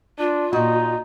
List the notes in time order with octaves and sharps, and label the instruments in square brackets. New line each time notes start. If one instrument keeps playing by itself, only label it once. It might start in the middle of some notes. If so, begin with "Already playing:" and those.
[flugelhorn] D4 [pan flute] F4
[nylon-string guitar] A#2 F#4 [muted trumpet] D#4 [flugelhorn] D#5